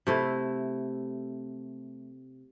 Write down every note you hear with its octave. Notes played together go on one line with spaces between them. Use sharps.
C3 A3 E4